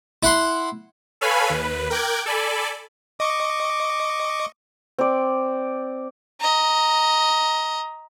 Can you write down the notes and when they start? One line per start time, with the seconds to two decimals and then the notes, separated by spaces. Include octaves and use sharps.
0.23 E4 F#5 C6
1.21 A4 B4 C#5 F5 G#5 B5
1.50 D#2 B4
1.90 A#4 G5 D6 F#6 G#6
2.26 A4 D5 G#5 B5
3.20 D#5 C#6 D6
4.98 C4 D5
6.40 D#5 A#5